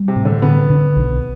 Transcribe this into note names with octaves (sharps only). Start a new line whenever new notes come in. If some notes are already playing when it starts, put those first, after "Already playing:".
Already playing: G3
C3
A2
D3
D3 B3
D3
B1